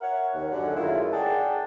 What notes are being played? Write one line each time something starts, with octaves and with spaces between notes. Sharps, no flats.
A#4 C#5 E5 F#5
D#2
F#2 D3 F#5
F#2 D#3 G#3 A3 E4 F4
G#4 D5 F#5 G5 A5